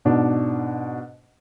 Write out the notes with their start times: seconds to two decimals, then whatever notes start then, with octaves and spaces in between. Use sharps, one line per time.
0.05 G#2 B2 D4